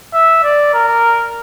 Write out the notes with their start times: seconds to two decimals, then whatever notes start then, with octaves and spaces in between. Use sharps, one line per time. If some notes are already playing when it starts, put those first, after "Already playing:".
0.14 E5
0.43 D5
0.74 A#4